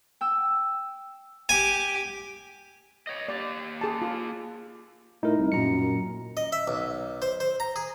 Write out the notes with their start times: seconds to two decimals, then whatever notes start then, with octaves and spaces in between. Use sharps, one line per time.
0.21 G5 E6
1.49 G4 G#5
3.07 C#5 D#5
3.28 A#3 G4 D5
3.81 G#4 A5
4.02 F4
5.23 A2 D#4 E4 A#4
5.38 C2
5.52 F#2 A#2 A#5 C#7
6.37 D#5
6.52 E5
6.68 B1
7.22 C5
7.40 C5
7.60 A#5
7.76 G#4